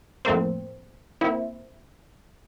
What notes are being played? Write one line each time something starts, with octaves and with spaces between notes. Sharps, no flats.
F2 A2 A3 A#3 C4
A#3 C4 E4